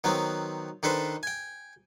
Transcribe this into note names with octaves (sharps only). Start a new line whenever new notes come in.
D#3 F#3 B3 C4
D#3 D4 A4 B4 C5
G5 G#5